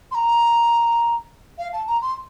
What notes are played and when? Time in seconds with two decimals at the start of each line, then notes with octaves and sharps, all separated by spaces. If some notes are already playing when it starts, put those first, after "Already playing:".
0.11 C6
0.14 A#5
1.58 F5
1.72 A5
1.87 A#5
2.02 C6